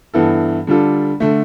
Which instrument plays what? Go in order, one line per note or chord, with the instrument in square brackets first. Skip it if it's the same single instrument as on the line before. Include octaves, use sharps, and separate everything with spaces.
[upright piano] G2 E3 B3 E4 A4
D3 G3 D4 F4 A4
D3 A3